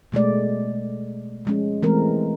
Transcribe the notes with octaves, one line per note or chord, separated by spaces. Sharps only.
B2 G#3 A3 D5
F3 G#3 C#4
E3 G#3 A3 C4 A#4